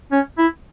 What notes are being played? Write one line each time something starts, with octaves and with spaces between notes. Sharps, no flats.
C#4
E4